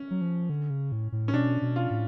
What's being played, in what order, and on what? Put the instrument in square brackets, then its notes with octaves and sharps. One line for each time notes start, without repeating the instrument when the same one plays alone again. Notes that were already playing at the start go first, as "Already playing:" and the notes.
Already playing: [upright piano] C#4
[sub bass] F#3
F3
D3
C#3
A2
A2
[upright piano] C#4
[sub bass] B2 [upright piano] D4
[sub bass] B2
[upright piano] F4
[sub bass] A2